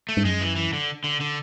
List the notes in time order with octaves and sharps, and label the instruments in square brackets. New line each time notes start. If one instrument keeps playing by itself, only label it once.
[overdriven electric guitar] A3
[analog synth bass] G#2
[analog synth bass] F#2 [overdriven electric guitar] G#3
[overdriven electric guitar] E3
E3
D3
D3
D3